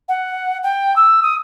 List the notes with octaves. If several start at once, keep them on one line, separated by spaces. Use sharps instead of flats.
F#5
G5
E6
D#6